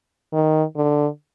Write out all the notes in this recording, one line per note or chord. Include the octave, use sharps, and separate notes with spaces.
D#3
D3